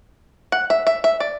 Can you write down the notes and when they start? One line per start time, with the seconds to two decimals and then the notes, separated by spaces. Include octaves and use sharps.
0.52 F#5
0.70 E5
0.87 E5
1.04 E5
1.20 D5